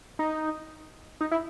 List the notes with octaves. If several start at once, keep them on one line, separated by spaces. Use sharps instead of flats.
D#4
D#4
E4